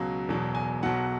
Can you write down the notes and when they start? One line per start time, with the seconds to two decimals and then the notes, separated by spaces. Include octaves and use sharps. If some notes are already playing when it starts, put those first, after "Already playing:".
Already playing: C#2 B2 F#3
0.28 E1 E2 B2 F#3
0.55 G#5
0.83 B1 B2 F#3 F#5